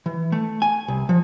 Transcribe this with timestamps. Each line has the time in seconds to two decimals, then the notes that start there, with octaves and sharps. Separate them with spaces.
0.06 E3
0.32 A3
0.62 G#5
0.88 C2
1.09 F3